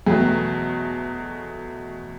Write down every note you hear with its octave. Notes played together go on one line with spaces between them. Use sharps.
E2 B2 F#3 A3 G#4